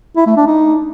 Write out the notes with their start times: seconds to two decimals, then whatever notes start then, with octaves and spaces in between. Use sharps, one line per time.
0.16 E4
0.27 A3
0.37 D4
0.47 D#4